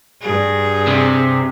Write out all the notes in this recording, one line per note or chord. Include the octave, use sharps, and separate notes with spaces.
G2 G#4
C3